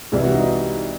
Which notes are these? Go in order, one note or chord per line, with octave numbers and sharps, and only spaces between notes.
C2 C3 E3 G#3 E4
F#4
D#4